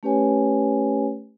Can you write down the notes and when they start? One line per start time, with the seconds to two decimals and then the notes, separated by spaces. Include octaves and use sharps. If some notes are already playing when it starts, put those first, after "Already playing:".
0.03 A3 C#4 G4 B4 C#5 G#5